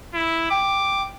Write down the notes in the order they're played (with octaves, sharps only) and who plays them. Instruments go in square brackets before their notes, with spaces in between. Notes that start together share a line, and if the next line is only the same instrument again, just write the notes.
[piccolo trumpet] E4
[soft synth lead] G5 [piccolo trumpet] D6